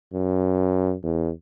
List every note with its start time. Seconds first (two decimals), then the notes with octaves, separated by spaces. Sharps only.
0.13 F#2
1.03 E2